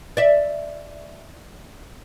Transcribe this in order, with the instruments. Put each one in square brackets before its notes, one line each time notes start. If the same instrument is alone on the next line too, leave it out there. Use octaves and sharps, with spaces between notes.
[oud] D5 E5